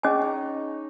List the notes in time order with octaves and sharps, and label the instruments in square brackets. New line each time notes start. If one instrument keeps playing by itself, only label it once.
[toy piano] C#4 G#4 D#5 G#5 [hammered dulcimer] C#5
[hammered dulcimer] D#4